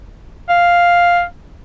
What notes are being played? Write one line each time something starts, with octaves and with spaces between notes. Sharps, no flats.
F5